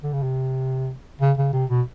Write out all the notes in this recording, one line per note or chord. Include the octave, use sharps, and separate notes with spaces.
D3
C#3
C3
C#3
C#3
C3
B2